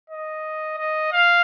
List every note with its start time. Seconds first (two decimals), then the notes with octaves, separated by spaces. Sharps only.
0.10 D#5
0.78 D#5
1.13 F5